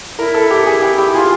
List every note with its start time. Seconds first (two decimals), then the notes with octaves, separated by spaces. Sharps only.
0.18 E4 A#4
0.34 A4
0.51 G4
0.66 G#4
0.82 G4
0.98 G4
1.14 F4 G#4